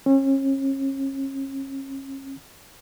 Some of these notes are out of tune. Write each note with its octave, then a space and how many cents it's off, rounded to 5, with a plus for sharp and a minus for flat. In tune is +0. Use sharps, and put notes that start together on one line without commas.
C#4 -35